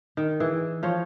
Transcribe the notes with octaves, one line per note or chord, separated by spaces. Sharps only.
D#3
E3 G#4
F3 F4 C#5